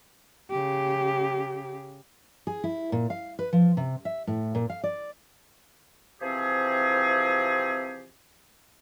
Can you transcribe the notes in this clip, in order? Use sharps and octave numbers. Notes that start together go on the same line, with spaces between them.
C#3 G4
G#4
E4
A#2
F5
B4
F3
C3
E5
A2
A#2
F5
D5
C3 E3 F3 C4 G4 G#4